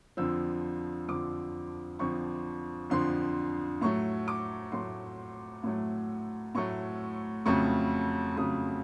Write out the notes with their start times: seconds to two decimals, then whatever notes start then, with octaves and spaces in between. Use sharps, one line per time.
0.17 F2 D3 F3 E6
1.08 F2 D3 F3 D6
1.99 F2 D3 F3 C#6
2.90 F2 D3 F3 C6
3.81 A2 F#3 A3 C#6
4.28 D6
4.72 A2 F#3 A3 C6
5.63 A2 F#3 A3
6.55 A2 F#3 A3 C#6
7.46 F2 C#3 F#3 A3 C#6
8.36 F2 C#3 F#3 A3 D#6